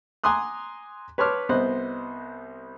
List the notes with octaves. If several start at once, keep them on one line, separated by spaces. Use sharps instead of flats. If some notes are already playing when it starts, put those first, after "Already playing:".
G#5 A#5 C6 D6 D#6 F#6
B4 C#5 A5 C6 D6 F6
C2 B3 C5 D#5 F#6